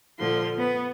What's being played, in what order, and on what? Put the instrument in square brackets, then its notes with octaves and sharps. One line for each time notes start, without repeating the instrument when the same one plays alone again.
[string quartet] A#2 D3 F3 C6
B3